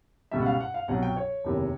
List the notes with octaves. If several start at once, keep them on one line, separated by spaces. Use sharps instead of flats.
C#2 B2 G3 E5
F#5
F5
F#5
F5
C2 B2 F#3 F#5
G5
C#5
F#1 E2 C3 D#3